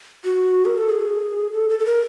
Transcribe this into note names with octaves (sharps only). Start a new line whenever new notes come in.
F#4
A#4
A4
G#4
A4
A4
A4
A#4